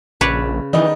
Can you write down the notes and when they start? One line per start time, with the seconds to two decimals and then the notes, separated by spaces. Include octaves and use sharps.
0.21 A#1 C#3 B4 C#5 D5
0.73 D#3 E3 G3 B3 D#4